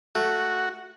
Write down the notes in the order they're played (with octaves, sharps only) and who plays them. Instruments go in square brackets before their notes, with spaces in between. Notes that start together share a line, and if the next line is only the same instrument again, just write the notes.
[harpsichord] A3 [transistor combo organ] F#4